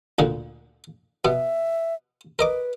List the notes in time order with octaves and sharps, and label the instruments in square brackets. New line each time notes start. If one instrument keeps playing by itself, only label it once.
[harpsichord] D2 A#2 D3
[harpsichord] B2 B3 [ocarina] E5
[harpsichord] A#4 D#5 D6 [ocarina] B4